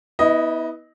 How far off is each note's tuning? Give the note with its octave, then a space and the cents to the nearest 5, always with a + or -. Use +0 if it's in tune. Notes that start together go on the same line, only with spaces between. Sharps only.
B3 +0 E4 -35 D#5 +0